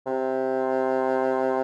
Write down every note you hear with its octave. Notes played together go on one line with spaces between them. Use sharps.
C3